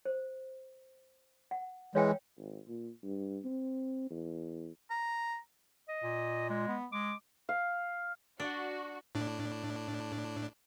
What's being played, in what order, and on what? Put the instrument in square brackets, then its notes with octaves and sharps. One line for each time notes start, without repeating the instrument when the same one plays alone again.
[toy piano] C5
F#5
[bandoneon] E3 G#3 [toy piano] C#5 F5 G5
[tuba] G#1
A#2
G2
C4
E2
[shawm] A#5
[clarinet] D#5
[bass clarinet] A#2
[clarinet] G#3
[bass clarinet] B3
[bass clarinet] G#3 [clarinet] D6
[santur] F5
[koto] D4 [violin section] F#4
[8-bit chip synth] A2 D4